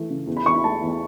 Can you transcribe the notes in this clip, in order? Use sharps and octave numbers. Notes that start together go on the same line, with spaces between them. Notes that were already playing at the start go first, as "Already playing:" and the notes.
Already playing: E3 A3
C#3
E2
B5
E2 C#6
B5
A3 A5
E2